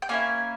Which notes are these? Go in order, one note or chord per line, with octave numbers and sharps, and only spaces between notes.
G5
A#3 C#4 E4 G#5